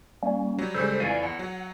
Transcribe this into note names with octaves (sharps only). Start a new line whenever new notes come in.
G3 A#3 C#4
F#3 G3
C#3 G3 G#3 A4 C5
F2 E3 D5 F5 G#5
E2 F#5
F#3